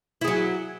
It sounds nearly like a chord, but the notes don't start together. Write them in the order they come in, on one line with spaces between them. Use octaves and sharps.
E4 G#4 F#3